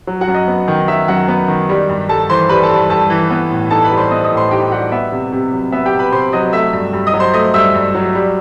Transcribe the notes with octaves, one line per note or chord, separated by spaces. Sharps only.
F#3
F#4 F#5
F#2
D#5
B3
D#3
F#3 E5
F#2 F#4 F#5
B3
D#3
G3
G2
G2 A4 A5
E3 C5 C6
G3 B4 B5
A4 A5
G2
G2 A4 A5
E3
B3
A2
D#4 A4 A5
B4 B5
G3
C5 C6
B3 D#5 D#6
D#5 D#6
A2
C5 C6
D#4 G4 G5
G3 F#4 F#5
B3 E5
C3
C3
F#3
B3 E5
G4 G5
C3
B4 B5
C3 C5 C6
F#3 D#5 D#6
A3 E5 E6
G2
G2
D#5 D#6
F#3
C5 C6
A3 D#5 D#6
G2 E5 E6
G2
F#3
G3